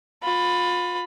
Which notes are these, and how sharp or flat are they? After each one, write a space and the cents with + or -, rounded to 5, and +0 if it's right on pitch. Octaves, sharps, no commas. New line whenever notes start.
F4 +30 B5 +10